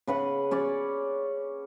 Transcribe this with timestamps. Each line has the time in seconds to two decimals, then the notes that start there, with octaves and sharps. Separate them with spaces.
0.07 C#3 B4 F#5
0.51 C#4 C#5 D5